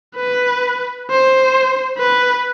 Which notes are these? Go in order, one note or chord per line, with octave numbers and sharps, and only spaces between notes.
B4
C5
B4